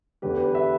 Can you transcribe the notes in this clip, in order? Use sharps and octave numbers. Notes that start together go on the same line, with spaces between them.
E2 D3 G4 B4
G4 B4
B4 E5